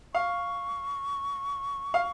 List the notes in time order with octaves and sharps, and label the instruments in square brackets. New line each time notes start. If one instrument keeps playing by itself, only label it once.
[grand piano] F5 [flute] C#6
[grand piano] F5